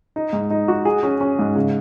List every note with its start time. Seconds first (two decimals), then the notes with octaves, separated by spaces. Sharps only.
0.16 D#4
0.33 G#2
0.51 D#4
0.68 F#4
0.85 G#4
1.03 C#4
1.21 C#4
1.39 G#2
1.56 C#3